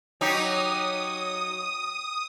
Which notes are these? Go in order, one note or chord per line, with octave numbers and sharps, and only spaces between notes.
F#3 D#4 G4 D#6